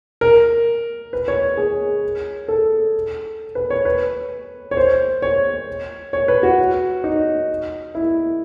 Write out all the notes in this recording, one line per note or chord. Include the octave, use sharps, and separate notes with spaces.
A#4
B4
C#5
G#4
A4
B4
C#5
B4
C#5
C5
C#5
C#5
B4
F#4
D#4
E4